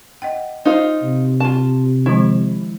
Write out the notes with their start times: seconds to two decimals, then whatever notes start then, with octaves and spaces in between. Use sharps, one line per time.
0.22 D#5 F#5 G5
0.65 D#4 F4 C5
1.03 C3
1.40 F4 A5
2.06 D#3 F3 G#3 E4